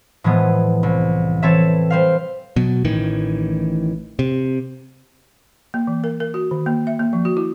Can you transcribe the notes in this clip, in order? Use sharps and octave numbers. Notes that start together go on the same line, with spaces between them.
A2 E3 F3 G#3 B3
C2
E3 C4 A4 C#5 E5
G3 C5 F5
B2 F#3
A1 A2 D#3 E3
C3
A#3
E3
A#4
A#4
F#4
D#3
A#3
E5
A#3
F3
F#4
E4